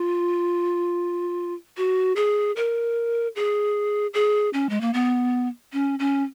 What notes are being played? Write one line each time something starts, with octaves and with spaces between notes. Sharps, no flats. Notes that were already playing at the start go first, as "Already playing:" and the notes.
Already playing: F4
F#4
G#4
A#4
G#4
G#4
C#4
G#3
A#3
B3
C#4
C#4